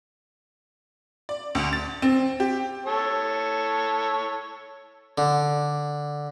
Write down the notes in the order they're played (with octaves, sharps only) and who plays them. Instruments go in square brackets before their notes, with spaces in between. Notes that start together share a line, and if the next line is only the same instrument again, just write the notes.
[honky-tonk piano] D5
D2
A6
C4
G4
[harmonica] A4 C#5
[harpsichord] D3